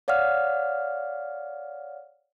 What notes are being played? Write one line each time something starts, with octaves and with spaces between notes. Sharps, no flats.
C#5 D5 F5 F#5 F6